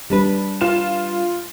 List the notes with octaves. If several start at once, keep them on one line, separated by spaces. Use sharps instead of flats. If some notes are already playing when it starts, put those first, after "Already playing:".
G3 D4 B4
F4 E7